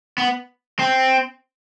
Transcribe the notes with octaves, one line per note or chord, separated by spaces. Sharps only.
B3
C4